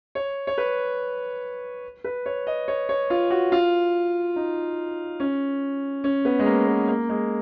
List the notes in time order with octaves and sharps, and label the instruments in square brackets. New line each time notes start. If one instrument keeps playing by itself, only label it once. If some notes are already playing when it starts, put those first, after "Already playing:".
[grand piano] C#5
C#5
B4
B4
C#5
D#5
C#5
C#5
F4
F#4
F4
D#4
C#4
C#4
B3
G#3
A#3
B3
A#3
G#3